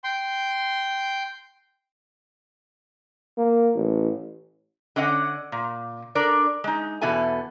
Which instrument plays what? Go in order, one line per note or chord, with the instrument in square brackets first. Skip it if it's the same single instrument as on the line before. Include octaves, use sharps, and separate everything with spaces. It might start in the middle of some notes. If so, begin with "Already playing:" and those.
[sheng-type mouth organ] G5 C6
[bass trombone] A#3
A1
[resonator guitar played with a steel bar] D3 C#4 D5 D#5 F5 F#5
A#2
D4 A4 A#4 D5
G#3 D#4
E2 B2 E4 A4 G#5